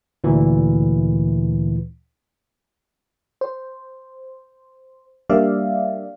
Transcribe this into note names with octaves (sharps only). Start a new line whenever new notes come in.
D2 A#2 E3
C5
G3 A#3 D4 D5 E5 F5